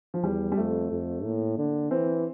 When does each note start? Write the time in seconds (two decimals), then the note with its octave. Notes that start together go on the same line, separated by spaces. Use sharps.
0.14 F3
0.23 E2 G3
0.52 G3
0.57 F2 A3
0.91 F2
1.24 A2 A#3
1.58 D3
1.91 E3 C4